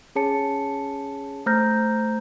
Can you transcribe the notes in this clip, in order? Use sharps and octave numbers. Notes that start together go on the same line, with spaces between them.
C#4 G#4 C#5 A5 C#7
A3 C5 A#5 F6 G6 A#6